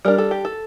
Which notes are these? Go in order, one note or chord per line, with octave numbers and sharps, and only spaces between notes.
G3 D4 A#4
A4
G4
A4